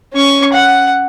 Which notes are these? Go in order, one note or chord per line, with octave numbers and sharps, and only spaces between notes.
C#4 C#6
F#5